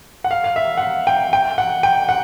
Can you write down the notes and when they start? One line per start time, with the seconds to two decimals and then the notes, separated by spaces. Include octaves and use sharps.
0.24 F#5
0.31 F5
0.44 F5
0.56 E5
0.77 F#5
0.82 F5
1.07 G5
1.33 G5
1.58 F#5
1.83 G5
2.09 F#5